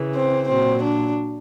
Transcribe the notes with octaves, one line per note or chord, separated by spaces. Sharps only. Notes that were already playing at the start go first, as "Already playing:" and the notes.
Already playing: C#3 E3
C4
A#2 F#3 C4
D4